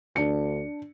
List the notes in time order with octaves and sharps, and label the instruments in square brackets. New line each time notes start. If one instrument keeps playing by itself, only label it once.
[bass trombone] D2 [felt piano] D4 C#7